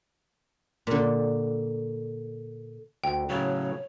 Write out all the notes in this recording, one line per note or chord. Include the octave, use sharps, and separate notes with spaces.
A#2 D3
D2 G5
A2 C#3 F#3 C#5